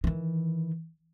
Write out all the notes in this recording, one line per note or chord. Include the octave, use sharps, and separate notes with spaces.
D#3 E3